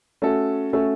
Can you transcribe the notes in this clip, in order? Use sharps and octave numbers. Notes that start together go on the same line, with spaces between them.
A3 C#4 F#4 A4
A3 C#4 F#4 A4